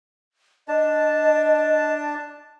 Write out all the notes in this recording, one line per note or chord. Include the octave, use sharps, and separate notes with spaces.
D4 D#5 A5